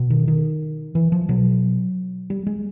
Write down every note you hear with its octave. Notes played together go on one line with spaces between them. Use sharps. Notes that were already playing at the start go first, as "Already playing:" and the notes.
Already playing: B2
D#3
D#3
E3
F3
B2 F#3
G3
G#3